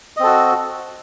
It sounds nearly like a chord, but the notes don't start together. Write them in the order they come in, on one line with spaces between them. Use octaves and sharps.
D#5 C4 A4 F#4